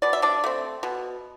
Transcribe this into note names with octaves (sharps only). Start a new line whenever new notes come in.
B2 D5
E5
D4 D5
A3 C4
B2